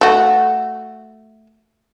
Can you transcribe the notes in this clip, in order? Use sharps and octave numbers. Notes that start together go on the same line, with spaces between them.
A3 F#4